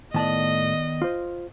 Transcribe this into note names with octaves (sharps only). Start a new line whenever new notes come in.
A2 D#3 B3 D5 D#5 A5
F4 C5